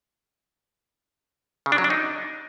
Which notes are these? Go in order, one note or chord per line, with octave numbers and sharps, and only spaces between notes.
C#3
D4
F#3
D4
D#4